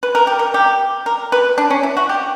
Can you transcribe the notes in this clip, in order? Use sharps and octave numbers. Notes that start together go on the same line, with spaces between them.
B4
A#4
G4
A#4
G4
A#4
B4
D4
C#4
E4
F#4
G4